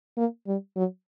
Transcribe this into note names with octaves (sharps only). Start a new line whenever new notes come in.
A#3
G3
F#3